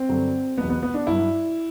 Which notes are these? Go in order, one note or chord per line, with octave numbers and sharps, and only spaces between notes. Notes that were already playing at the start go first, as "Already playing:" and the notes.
Already playing: C4
G2 D3 F#3
E2 B2 F#3 B3
B3
B3
D4
G2 F#3 E4